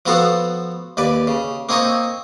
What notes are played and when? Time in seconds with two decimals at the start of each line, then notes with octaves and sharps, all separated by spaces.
0.06 F3 B3 F#4 A4 F5 F#5
0.97 D#2 B4 D5
1.27 C#3
1.69 A#3 C4 D#4 C#5 D#5 C#6